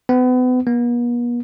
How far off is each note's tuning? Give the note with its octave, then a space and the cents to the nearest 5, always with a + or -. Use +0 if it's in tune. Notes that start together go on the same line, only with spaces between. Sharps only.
B3 +35
B3 -45